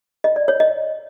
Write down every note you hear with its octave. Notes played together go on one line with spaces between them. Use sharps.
D#5
D5
C#5
D#5